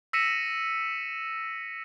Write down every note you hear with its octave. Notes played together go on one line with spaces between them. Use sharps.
E6 A#6 B6 C#7 D#7 E7